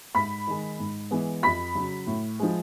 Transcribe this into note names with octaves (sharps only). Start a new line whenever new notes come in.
G#2 B5 B6
D#3 G#3
G#2
E3 G#3 B3
F2 B5 B6
C#3 F#3
A2
F3 G#3